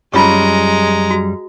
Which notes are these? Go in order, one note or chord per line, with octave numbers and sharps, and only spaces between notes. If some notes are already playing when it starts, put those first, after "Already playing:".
F#2 G3 G#3 C#4 F4 A#5 C#6
F#4